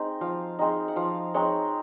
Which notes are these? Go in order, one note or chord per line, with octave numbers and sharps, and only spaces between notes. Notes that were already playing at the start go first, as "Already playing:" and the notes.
Already playing: G#3 C4 D#4
F3 F5
G#3 C4 D#4
F#5
F3 F5
G#3 C4 D#4 C#5